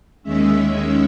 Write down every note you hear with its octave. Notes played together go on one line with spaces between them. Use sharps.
D#2 D#3 G#3 C#4 E5
E5